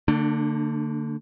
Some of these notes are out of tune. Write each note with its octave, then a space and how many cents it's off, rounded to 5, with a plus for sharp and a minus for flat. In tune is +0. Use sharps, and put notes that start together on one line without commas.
D3 +0 A#3 -45 D4 +35